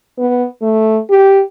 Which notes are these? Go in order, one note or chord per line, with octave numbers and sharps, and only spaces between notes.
B3
A3
G4